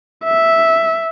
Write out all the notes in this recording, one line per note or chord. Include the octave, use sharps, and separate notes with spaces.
E5